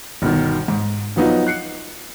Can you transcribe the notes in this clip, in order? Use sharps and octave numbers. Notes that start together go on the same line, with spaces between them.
G1 B2 D#3
G#2
F3 F#3 B3 D#4 F4
F#6 C7 C#7